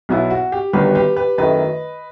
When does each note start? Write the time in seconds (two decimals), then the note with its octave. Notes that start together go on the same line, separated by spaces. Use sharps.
0.09 B1 B2 F#3 B3 E4
0.31 F#4
0.52 G4
0.73 G1 G2 D#3 F#3 B3 G4 B4
0.95 G4 B4
1.17 G4 B4
1.38 F#2 D#3 A3 E4 B4 D#5